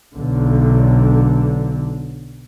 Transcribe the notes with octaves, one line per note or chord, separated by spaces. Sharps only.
B1 D3